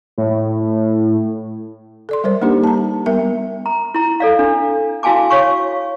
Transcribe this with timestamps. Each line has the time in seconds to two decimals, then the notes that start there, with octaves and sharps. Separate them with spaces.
0.18 A2
2.09 A4 D5 C6
2.24 G3 A#4 C5 D5
2.42 A#3 D4 D#4 G4
2.64 A5 A#5
3.06 G3 B3 A#4 E5
3.66 A#5
3.94 E4 A#5
4.20 A4 D5 F5
4.39 D4
5.03 E4 F#4 F5 G#5 A5 D6
5.30 C#5 F5 C#6